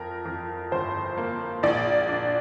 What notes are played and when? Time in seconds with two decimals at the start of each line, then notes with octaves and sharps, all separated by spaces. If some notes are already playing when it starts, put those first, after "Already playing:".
Already playing: F2 A#4
0.25 F2
0.71 G1 C5
1.18 A#3
1.63 A#1 D5
2.09 D4